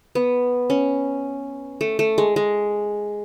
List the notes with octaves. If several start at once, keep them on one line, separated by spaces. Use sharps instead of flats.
B3
C#4
A3
A3
G#3
G#3